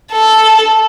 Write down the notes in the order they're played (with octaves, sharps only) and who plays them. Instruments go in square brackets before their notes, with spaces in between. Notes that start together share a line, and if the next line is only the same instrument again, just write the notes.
[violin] A4